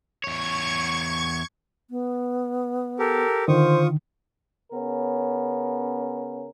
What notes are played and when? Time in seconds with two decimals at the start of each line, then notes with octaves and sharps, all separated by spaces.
0.24 E2 C#5 C#6 G#6
1.90 B3
2.99 G4 A4 A#4
3.48 D3 D#3 F4 C5 C#6 D#6
4.72 C#3 B3 C#4 A#4